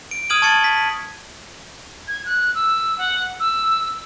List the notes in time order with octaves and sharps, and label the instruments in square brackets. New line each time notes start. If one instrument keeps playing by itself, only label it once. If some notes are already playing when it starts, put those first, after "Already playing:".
[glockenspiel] D7
D#6 F6 G#6 D#7 F#7
A5 C#6 G#6 A6 C#7 F#7
B6
[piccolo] G#6
F#6
E6
F#5
E6